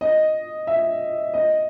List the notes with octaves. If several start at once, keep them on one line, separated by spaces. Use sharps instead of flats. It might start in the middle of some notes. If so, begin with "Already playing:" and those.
D#5
E5
D#5